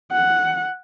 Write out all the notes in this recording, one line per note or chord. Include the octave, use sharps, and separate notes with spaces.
F#5